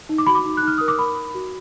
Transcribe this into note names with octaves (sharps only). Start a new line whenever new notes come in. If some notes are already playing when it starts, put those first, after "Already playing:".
D#4
D6
F#4 B5
D6
D#4
F#6
D#4 F6
A#4 D#6
D6
A#4 B5
A#4
F#4